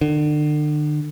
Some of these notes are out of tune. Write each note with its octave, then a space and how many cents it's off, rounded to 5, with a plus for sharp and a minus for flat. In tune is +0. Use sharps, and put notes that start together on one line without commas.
D3 +35